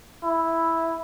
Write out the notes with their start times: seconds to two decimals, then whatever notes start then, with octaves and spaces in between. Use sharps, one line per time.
0.23 E4